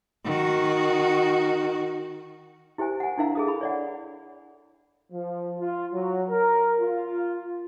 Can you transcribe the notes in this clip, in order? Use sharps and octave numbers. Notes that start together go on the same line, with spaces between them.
D#3 F#4
E4 G4 A#4 C5 G#5
F#5 G#5
D4 E4 A#4 F5 A#5
G#4 A4 D#6
E4 A4 B5
C#5 D5 F#5
F3
F4
F#3
A#4
F4